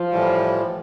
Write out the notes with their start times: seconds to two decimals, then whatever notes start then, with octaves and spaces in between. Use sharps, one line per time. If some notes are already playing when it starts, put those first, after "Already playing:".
Already playing: F3
0.12 A2 E3 G3